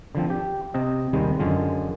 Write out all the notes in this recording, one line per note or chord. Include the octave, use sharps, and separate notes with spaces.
D3 F3 C4
G4
C3 C4 D#5
D#2 C3 D#3 G3 G#3
F#2 D3 G#3 F4